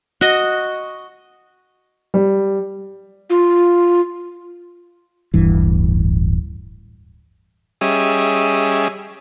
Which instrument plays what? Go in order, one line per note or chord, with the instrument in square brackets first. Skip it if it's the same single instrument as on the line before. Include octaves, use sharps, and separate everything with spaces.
[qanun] F#4 D#5
[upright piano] G3
[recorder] F4
[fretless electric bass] D1 A1 G2 E3
[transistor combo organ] G3 C#4 G#4 D#5 E5